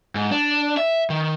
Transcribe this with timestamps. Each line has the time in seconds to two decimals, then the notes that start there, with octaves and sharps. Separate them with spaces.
0.15 G#2
0.31 D4
0.77 E5
1.10 D#3